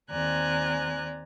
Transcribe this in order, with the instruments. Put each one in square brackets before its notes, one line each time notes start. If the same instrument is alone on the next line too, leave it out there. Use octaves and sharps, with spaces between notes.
[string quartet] D#2 C4 D5 G#5 A#5 F#6